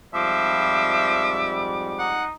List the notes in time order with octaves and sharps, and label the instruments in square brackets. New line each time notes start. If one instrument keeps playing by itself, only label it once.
[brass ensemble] F2 G#2 G3 [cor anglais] F3 [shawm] E5 [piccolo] D6
[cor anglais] D#4 [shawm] F#5